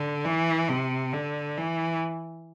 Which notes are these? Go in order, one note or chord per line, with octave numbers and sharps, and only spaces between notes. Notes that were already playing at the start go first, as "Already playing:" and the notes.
Already playing: D3
E3
C3
D3
E3